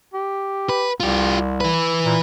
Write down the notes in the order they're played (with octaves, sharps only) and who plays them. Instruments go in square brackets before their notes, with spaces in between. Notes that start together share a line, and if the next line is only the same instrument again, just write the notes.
[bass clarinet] G4
[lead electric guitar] B4
[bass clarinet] C2 [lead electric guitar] F4 G4
[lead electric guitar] E3 B4
[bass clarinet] A#2